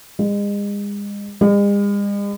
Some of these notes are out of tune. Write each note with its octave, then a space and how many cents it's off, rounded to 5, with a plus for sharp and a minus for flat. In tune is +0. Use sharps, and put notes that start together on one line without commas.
G#3 -35
G#3 -45